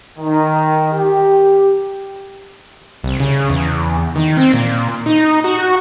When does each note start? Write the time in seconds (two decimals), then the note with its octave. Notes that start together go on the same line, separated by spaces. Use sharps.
0.19 D#3
0.94 G4
3.04 C2
3.20 C#3
3.50 E2
4.16 D#3
4.37 C4
4.53 A#2
5.06 D#4
5.44 F#4